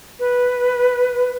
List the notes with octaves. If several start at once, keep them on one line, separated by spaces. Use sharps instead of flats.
B4